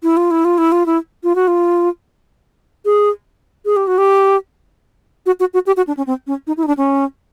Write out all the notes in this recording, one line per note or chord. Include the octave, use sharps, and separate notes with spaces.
E4
F4
E4
F4
E4
F4
E4
F4
F#4
F4
G#4
G#4
G4
F#4
G4
F#4
F#4
F#4
G4
F#4
D4
C#4
C4
C#4
D#4
E4
D#4
D4
C#4